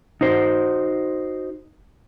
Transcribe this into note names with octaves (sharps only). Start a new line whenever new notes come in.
D#4 F#4 C5